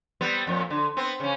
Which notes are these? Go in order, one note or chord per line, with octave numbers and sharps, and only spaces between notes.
G3 B3 C4
F2 A#2
D3
B3 C4
C#3 C#4